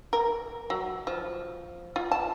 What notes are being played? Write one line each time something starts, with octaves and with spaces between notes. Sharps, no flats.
A#4
F#3
F3
F4
A5